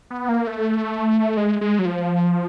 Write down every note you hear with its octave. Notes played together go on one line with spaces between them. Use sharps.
B3
A#3
A3
G#3
G#3
F#3
F3